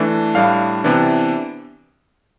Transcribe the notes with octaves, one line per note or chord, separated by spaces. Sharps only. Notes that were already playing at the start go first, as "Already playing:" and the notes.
Already playing: E3 A3 D4
A2 G3 D4 F5
C3 E3 B3 D4